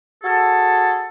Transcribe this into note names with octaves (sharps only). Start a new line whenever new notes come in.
F#4 G#4 A4